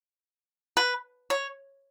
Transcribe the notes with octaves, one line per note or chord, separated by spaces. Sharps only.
B4
C#5